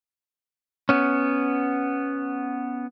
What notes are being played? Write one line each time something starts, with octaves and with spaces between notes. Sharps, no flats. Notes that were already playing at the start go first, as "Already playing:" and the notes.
B3 C#4